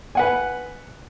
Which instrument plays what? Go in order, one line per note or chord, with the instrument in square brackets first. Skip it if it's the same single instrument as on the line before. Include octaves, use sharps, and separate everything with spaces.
[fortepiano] B4 F#5 G#5